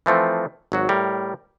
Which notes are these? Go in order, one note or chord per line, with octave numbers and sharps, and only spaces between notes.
E3 F3 A3 C4
G#1 F#3 F#4
A2 G3 A#4